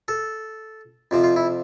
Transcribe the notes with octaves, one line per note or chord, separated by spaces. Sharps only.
A4
F2 C3 F3
F4
E4